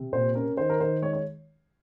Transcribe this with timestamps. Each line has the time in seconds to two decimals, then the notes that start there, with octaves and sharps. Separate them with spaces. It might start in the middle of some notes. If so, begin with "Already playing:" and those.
Already playing: C3
0.13 A#2 C5
0.35 C#4 A#4
0.57 D#3 C5
0.70 A#4
0.80 D#3 C5
1.02 G#3 C#5
1.13 C#5